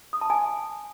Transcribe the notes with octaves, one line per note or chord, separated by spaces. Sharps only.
D#6
A5
G#5